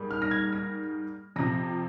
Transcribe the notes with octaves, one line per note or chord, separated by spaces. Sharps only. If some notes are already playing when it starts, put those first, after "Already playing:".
Already playing: G#2 G3 A#3
F6
A#6
G#6
A#6
F2 C3 F3 A#6